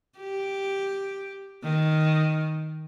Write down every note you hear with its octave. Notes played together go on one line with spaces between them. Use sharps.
G4
D#3